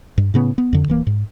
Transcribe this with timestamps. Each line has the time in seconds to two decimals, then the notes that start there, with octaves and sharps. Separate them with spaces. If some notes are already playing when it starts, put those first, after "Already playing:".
0.18 G2
0.34 A2 C#3 B3
0.58 B3
0.73 F2 D3
0.88 D1 E3 A#3
1.07 G#2